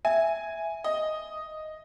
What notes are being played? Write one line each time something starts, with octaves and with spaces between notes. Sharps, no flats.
E5 G#5
D#5